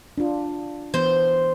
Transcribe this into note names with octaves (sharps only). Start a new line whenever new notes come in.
D4 F4
E3 B3 C5